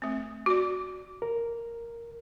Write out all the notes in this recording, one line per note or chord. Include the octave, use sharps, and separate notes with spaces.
A3 C4
F#4 D5
A#4